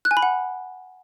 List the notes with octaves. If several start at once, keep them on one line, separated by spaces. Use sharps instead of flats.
F#6
G#5
B5
F#5